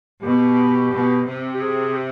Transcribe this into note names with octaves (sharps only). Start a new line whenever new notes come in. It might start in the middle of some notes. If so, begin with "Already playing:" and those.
B2 G4
B2
C3
G4
G#4
G4